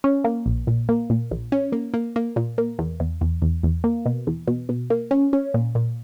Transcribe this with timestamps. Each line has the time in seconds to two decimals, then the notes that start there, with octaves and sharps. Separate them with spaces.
0.04 C#4
0.24 A#3
0.46 A#1
0.67 A#2
0.89 A#3
1.10 A#2
1.31 A#1
1.52 C#4
1.72 A#3
1.94 A#3
2.16 A#3
2.36 A#2
2.58 A#3
2.79 E2
3.00 E2
3.21 E2
3.42 E2
3.63 E2
3.84 A#3
4.06 B2
4.27 E2
4.48 B2
4.69 B2
4.90 A#3
5.11 C#4
5.33 C#4
5.54 A#2
5.75 A#2